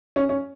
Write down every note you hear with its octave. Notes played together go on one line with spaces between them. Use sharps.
C#4
C#4